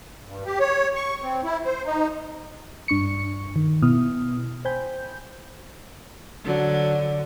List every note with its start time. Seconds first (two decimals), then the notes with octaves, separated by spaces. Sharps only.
0.26 G2
0.46 G4
0.59 C#5
0.96 C#6
1.23 C4
1.44 E4
1.65 C5
1.86 D#4
2.88 G2 D4 C#6 C#7
3.56 D#3
3.82 B2 B3 E4 D#6 F6
4.65 C5 G5 G#5 B5 G6
6.44 D3 F#3